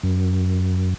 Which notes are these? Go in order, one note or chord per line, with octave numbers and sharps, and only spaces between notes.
F#2